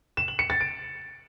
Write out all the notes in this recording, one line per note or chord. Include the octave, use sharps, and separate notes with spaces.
E7
F#7
C#7
A6
D7